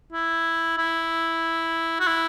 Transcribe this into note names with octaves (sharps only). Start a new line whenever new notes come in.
E4
E4
F#4
E4